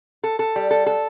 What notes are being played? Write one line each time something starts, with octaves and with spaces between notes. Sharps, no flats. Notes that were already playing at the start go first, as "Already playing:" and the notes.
A4
A4
G3
A4
A4